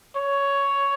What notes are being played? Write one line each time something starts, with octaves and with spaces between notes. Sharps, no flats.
C#5